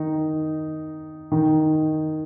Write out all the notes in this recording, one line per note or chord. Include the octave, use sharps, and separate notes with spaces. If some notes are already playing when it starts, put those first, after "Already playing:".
Already playing: D#3 D#4
D#3 D#4